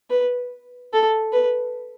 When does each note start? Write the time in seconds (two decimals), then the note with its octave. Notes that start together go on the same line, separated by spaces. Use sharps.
0.10 B4
0.93 A4
1.33 B4